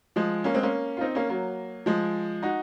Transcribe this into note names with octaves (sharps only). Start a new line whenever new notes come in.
F3 G#3
A#3 C#4
G#3 C4
A#3 C#4
F4
C4 D#4
A#3 C#4
F#3 A#3
F3 G#3
D#4 F#4